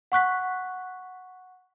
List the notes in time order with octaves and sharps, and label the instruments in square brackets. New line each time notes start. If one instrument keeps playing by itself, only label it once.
[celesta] F#5 C#6 F#6 B6